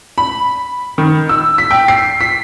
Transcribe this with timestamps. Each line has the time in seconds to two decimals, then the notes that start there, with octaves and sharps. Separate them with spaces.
0.18 B5
0.98 D#3
1.29 E6
1.58 B6
1.71 G5
1.88 C7
2.21 B6